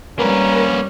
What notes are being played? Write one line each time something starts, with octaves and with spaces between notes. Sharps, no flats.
G3 A#3 C#4 A#4 B4